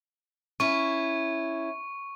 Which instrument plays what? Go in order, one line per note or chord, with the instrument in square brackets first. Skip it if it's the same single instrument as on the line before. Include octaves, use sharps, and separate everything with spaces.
[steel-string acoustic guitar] C#4 E4 [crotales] C#6